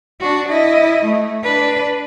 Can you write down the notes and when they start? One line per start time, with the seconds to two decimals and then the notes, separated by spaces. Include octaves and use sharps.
0.20 D4 F#4
0.48 E4 D#5
1.05 A3
1.43 D4 B4